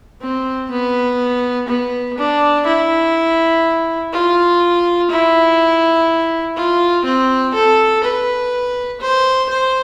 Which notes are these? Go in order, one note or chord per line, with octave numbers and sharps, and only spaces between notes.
C4
B3
B3
D4
E4
F4
E4
F4
C4
A4
B4
C5
C5